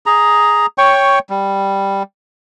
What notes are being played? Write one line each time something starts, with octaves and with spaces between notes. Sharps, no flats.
G#4 A#5
C#5 G5 C#6
G3